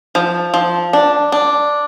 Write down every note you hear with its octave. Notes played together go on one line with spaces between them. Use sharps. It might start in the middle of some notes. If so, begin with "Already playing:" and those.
F3
F3
D4
D4